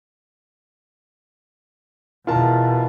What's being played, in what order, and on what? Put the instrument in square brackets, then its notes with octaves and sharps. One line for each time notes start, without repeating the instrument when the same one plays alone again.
[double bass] E2 B2 [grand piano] F4 A#4 A5